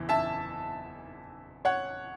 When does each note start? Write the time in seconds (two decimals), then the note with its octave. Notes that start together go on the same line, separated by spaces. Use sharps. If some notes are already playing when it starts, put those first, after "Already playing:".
Already playing: F#1 E2 E3
0.09 E5 A5
1.65 C#5 F#5